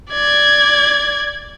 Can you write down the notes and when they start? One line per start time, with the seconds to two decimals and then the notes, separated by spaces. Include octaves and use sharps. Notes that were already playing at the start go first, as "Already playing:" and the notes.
0.12 D5 G#6